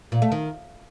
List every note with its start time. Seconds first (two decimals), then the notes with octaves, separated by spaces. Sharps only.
0.12 A#2
0.22 A3
0.32 D#3